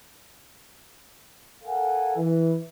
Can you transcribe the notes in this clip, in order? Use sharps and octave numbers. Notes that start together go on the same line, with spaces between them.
A4 A#4 F5 F#5 G#5
E3